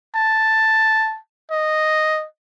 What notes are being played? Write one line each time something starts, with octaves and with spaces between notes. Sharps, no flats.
A5
D#5